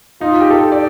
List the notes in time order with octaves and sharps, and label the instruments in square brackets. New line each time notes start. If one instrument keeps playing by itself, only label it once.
[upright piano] D#4 [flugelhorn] F4
[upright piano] G4
A4
D5